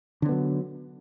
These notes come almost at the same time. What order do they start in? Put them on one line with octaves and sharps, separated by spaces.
D3 C#4 B3 F#3